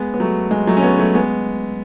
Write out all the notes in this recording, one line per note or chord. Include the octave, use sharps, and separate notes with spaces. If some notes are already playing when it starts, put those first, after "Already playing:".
Already playing: G#3 B3
B3
F#3 A3
G#3
F#3 A3
C#4
G#3 B3
F#3 A3
G#3 B3